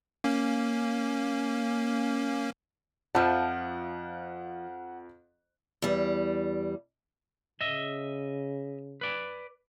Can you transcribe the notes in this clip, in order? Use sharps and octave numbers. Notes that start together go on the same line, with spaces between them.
A#3 C#4
F2 F3 E5 F#5 A5 F6
E2 G3
C#3 D#5 E5
B4 D5